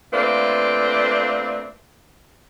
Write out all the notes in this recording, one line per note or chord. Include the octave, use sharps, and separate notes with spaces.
A3 A#3 C4 D4 F4 B4